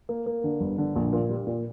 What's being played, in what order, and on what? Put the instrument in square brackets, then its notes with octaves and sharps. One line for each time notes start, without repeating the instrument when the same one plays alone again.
[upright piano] A#3
A#3
D3
G1
D3
A#1
A#2
G3
A#2